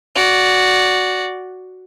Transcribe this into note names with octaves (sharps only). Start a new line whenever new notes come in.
F#4 D5